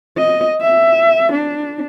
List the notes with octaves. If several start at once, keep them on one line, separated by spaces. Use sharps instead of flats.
D#5
E5
D4